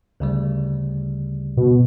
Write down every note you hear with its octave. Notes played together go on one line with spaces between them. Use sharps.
D2 C#3 G3
B2